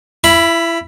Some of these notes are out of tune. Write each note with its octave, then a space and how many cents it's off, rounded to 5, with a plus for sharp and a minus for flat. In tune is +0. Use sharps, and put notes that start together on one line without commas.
E4 +25 B5 +0